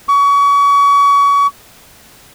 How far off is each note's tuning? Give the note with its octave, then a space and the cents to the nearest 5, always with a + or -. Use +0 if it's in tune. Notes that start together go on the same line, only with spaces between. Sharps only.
C#6 +35